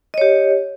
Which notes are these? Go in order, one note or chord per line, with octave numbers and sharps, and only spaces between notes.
G4 C#5 D#5